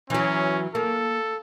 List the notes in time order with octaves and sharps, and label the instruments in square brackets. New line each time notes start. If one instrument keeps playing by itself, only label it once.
[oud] E3 F#3 [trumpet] C#4
[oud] A#3 [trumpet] A4